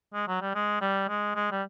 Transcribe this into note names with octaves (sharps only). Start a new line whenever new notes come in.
G#3
F#3
G3
G#3
G3
G#3
G#3
G3